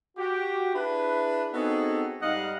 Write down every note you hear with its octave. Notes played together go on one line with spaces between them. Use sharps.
F#4 G4
D4 E4 G#4 B4
B3 C4 D#4 F#4 G#4 A4
G#2 G3 D#4 D#5 F5 F#5